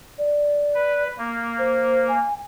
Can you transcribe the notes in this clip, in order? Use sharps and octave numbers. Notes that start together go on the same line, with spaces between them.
D5
B4
A#3
C5
G#5